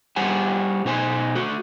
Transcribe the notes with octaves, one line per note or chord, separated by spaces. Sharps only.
G3 G4 C5 F#5 G#5
B2 D#4 C5 G#5
A3 F#4